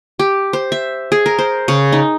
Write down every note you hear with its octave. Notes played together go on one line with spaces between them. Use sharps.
G4
C5
E5
G#4
A#4
C5
C#3
D#4